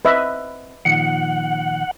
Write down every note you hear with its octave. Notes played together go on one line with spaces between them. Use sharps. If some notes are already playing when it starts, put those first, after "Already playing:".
C4 B4 D#5 E5
A#2 D#3 F3 F#5